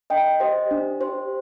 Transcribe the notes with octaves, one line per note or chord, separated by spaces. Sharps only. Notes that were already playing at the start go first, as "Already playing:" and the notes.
D4 D#5 G5
G4 C5 D#5
D4
G4 C5